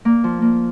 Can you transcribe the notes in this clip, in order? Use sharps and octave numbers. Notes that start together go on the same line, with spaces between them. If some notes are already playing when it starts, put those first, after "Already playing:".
A#3
F3
A#3